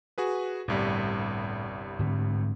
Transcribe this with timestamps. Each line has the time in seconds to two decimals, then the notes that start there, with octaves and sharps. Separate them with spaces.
0.18 F#4 G#4 B4
0.68 G1 C2 A2 G3
1.99 G#2 D3 C4